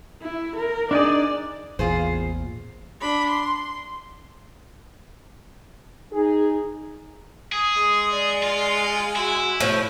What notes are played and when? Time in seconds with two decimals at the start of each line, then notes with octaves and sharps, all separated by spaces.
0.21 E4
0.55 A#4
0.91 D4 D#4 G#4 D5
1.79 A1 E2 A#2 F4 G#4 C5
3.01 D4 B5
3.30 C6
6.12 D#4 G#4
7.52 G#4 D#6
7.76 G#3
8.11 D5
8.43 F4
9.16 E4 F#4
9.60 A2 F3